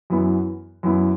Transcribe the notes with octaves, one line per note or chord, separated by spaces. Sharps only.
F#2 E3 B3 E4
F#2 E3 B3 E4